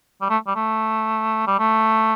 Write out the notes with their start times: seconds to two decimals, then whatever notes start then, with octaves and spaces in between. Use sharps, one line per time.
0.21 G3
0.30 A3
0.47 G3
0.56 A3
1.47 G3
1.59 A3